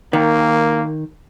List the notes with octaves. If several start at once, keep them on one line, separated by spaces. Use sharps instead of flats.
D#3 A#3